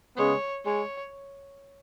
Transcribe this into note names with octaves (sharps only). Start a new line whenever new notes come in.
C#3 G#3 B3 C#5
G#3 C#5